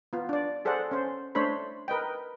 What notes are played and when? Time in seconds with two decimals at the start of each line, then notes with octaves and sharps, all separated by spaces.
0.13 B3 F4
0.29 D4 D5
0.65 G#4 A4 C5 D5 F#5
0.91 C#4 C5
1.35 A3 D4 C5 C#5 B5
1.88 A#4 B4 D#5 G5